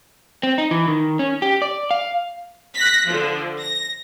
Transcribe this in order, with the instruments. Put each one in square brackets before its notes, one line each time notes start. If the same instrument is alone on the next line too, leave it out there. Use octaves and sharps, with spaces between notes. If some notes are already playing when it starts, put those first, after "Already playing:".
[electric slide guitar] C4
D#4
E3
D#3
C#4
G4
D5
F5
[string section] F#6 A#6 B6
D3 F3
A#6